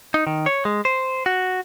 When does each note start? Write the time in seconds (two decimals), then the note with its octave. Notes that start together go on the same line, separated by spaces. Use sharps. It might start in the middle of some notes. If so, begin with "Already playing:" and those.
0.14 D#4
0.27 D#3
0.46 C#5
0.65 G#3
0.85 C5
1.26 F#4